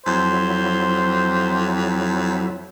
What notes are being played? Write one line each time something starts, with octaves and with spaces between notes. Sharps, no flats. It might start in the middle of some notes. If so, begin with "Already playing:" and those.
F2 F#3 E4 C5